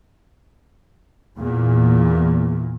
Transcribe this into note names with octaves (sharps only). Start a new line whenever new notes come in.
E2 A#2